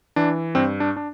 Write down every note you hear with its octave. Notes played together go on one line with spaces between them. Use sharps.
E3 D4
G2 C4
D4
D4